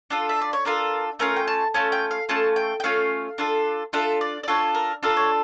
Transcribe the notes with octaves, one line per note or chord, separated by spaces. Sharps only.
D4 F4 A4
E5
D5
C#5
D4 F4 A4 A#4
A3 C#4 F4 A#4
G5
A5
A3 C#4 F4 A5
G5
F5
A3 C#4 F4 A5
G5
G5
A3 C#4 F4 F5
D4 F4 A4
D4 F4 A4 E5
D5
D5
D4 F4 A4 C#5
A#4
D4 F4 A4 A#4
C#5